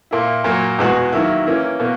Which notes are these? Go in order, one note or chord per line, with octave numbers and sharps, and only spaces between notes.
A#2 A#3 E4
A#2 F#3 A#3
E2 B2 G#3 B3 F#4
D#3 F#3 A#3 E4
E3 A#3 C#4
B2 A#3